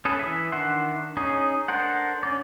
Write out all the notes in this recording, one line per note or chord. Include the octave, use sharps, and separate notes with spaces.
C#4 G#4 A4 B4
E3 E5
D#3 D4 E5 F#5 C6
C#4 D#4 G#4
D4 A4 A#4 C5 F#5
C#4 D5